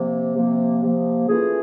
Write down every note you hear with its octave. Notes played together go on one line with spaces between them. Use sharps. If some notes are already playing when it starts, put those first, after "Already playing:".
Already playing: C3 F3 A#3
C3 F3 A#3
C3 F3 A#3
E3 A3 C#4 F4 G#4